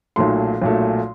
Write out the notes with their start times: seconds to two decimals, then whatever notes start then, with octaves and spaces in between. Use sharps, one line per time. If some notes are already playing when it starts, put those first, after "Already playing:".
0.16 B1 A#2 F#3 A3 C6
0.62 B1 A#2 F#3 A3